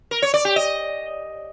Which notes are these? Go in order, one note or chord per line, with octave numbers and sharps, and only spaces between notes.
A#4
C#5
D5
G4
D#5